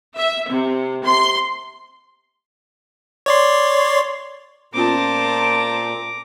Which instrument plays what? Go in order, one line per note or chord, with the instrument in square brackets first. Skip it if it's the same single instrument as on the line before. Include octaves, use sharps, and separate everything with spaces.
[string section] E5
C3
C6
[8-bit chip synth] C#5 D5 C6
[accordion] A#2 [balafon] B3 C#4 F4 [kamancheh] C5 A5 [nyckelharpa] A#5 D6